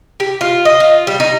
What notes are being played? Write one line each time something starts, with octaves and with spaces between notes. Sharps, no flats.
G4
F4
D#5
F4
G3
D#4